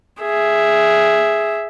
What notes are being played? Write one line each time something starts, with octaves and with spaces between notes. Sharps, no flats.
G#4 E5